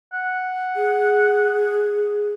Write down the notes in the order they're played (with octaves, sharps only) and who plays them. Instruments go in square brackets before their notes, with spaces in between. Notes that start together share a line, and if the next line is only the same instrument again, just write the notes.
[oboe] F#5
[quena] G#4